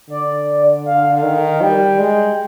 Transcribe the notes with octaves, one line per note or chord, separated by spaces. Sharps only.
D3 D5
F5
D#3
G3 G5
G#3